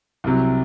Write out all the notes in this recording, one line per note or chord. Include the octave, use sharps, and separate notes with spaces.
C2 C3 F#3